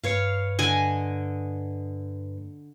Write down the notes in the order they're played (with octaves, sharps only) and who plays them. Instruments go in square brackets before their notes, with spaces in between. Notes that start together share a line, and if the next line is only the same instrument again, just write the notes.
[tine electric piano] G2 B4 C#7 [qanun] C#5 F5
[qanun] D3 D#5 G#5